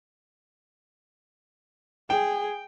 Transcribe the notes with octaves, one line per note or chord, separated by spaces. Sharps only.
G#4 G5